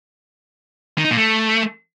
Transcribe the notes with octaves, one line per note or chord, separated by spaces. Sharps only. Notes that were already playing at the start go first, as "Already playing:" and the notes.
D#3
D#4
A#2
A3